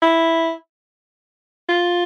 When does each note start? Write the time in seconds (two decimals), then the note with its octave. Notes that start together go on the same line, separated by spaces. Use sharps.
0.02 E4
1.69 F4